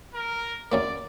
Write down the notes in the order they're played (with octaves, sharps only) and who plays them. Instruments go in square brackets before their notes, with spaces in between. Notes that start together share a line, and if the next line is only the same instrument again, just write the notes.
[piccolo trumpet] A#4
[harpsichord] F#2 F#3 A#3 [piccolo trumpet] D5